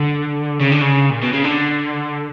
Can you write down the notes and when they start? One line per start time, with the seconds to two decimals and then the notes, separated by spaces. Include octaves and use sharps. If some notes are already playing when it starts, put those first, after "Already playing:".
Already playing: D3
0.61 C#3
0.72 D3
0.82 C#3
1.10 A#2
1.23 B2
1.33 C#3
1.44 D3